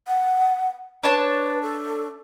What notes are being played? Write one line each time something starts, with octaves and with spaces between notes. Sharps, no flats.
F#5
D4 B4 C#5 A5
A4